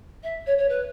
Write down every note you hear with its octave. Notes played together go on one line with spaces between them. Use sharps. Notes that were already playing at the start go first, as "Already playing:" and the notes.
E5
C#5
C#5
B4